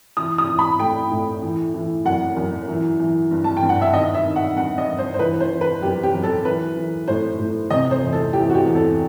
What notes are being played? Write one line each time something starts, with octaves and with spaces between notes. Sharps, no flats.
E3 D#6
D#6
E3
B5
A2 G5
A2
E3
E3
F#2 F#5
F#2
E3
E3
G2
A5
G5
G2
F#5
E5
D#3 D#5
E5
D#3
F#5
G2 F#5
D#5
G2
C5
C5
E3 B4
C5
E3
B4
F#2 G4
G4
F#2
A4
E3 B4
E3
A2 C5
A2
C3 D#5
C5
E2
A4
E3 G4
F#4
G4
E2
A4